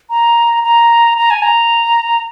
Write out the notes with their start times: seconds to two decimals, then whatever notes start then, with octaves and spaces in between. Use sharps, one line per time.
0.10 A#5
0.64 A#5
1.18 A#5
1.31 G#5
1.42 A#5